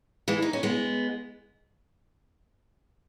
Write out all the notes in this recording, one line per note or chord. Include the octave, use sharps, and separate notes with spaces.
E3 G#3
D#4
C#4
G#3 B3